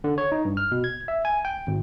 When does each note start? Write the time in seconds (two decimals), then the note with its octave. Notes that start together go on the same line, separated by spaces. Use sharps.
0.04 D3
0.18 C#5
0.32 D#4
0.45 G2
0.57 F6
0.72 B2
0.84 G#6
1.08 E5
1.25 G#5
1.45 G5
1.67 G#1